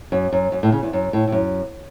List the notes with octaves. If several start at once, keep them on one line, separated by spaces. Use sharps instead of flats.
F#2
F#2
F#2
A2
C#3
E2
F#2
A2
A2
F#2